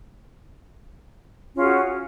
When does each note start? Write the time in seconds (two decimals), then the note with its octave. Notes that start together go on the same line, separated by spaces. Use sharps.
1.53 C#4
1.56 F4
1.59 G#4
1.61 F#4